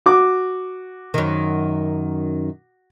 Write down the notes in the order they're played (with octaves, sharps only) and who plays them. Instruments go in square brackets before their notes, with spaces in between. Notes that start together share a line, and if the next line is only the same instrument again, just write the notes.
[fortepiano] F#4 D6
[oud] F#2 D#3